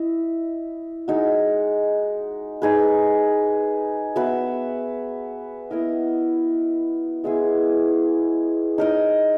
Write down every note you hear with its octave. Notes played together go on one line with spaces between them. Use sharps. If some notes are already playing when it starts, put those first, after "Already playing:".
Already playing: E4 D#5
G#3 D#4 F#4
D#4 G#4 B4
B3 F#4 B4 E5
B3 E4 A#4 D#5
G#3 B3 E4 G#4
D#4 A#4 D#5